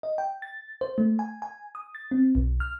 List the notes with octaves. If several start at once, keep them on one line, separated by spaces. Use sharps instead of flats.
D#5
G5
A6
C5
A3
G#5
G#5
D#6
A6
C4
B1
F6